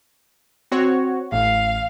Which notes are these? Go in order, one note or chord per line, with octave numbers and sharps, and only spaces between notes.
C4 F#4 C#5
A1 F5